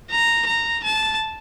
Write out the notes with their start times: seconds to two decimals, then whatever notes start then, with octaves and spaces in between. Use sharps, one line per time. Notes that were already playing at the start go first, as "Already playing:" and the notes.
0.12 A#5
0.47 A#5
0.84 A5